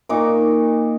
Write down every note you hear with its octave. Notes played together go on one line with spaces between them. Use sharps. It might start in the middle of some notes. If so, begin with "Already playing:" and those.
A#2 D#4 C#6 D6